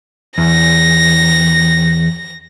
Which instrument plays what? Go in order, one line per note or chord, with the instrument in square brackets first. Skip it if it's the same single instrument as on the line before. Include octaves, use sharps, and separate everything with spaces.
[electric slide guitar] E2 [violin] A#6